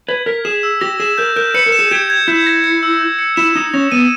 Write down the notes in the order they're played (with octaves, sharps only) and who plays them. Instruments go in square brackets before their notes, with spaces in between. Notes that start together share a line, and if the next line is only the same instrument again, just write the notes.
[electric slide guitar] B4 [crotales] G#6
[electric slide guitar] A#4 [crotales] B6
[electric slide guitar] G#4 [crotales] E7
[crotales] E6
[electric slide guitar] G4 [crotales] A#6
[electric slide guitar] G#4 [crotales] E7
[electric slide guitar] A#4 [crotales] G6
[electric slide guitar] A#4 [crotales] G6
[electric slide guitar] B4 [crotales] C#7
[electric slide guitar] A#4
[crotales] E7
[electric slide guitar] G#4
[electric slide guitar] G4 [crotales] G#6
[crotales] G#6
[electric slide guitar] E4 [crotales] G6
[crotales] A#6
C#7
E6
G6
C#7
[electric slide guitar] E4 [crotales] E7
[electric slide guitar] D#4 [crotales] D#6
[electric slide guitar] C#4 [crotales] A#6
[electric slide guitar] B3 [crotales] D#7